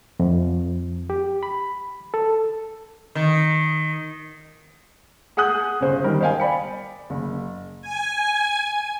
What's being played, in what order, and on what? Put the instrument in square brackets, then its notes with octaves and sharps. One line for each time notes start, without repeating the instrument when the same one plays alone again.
[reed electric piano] F2
G4
B5
A4
[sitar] D#3
[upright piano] G#4 F#5 G#5 D#6 F#6 G6
G1 C#3 C5
D#3 G3 A#4
C5 D#5 F5 G5 G#5
D5 B5 C#7
F#1
[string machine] G#5